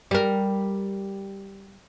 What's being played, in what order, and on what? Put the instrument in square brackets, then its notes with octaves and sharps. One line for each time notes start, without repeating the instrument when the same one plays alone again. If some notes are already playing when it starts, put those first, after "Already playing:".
[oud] G3 A#4